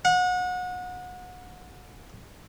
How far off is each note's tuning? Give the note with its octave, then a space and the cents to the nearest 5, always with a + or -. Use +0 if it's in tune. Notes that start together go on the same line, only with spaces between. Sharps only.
F#5 -30